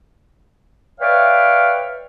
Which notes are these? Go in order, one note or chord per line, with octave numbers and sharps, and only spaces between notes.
B4 C#5 D5 E5 F5 G5